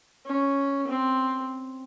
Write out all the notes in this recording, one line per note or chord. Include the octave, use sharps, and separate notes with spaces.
C#4
C4